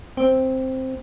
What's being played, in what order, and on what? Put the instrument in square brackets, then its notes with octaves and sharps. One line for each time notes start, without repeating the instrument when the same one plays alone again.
[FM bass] C4